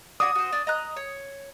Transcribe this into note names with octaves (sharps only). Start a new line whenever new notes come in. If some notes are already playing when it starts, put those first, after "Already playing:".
D4 F#4 C#5 D#6
F#4 C5
D4
D#5 A#5 F#6
C#5